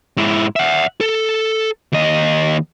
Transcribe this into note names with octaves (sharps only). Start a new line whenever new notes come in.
G#2 E4
E5 F#5
A4
D#2 D#5